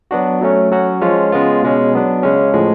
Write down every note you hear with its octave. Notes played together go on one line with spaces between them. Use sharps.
F#3 B3 D4 F#4
F#3 A3 C#4
F#3 C#4 F#4
F3 G#3 C#4 F4
C#3 G#3 B3 F4
B2 G#3 C#4
F#3 B3 D4
C#3 G#3 C#4
A2 F3 G#3